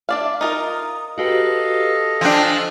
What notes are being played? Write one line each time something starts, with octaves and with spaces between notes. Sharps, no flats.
D4 D5 E5 F5
D#4 F4 A#4 A#5 D#6
F#4 G4 A4 B4 D#5 F5
F3 D4 G5 G#5 E6